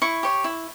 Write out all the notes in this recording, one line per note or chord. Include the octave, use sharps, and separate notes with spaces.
E4 C#6
G4 C#5
E4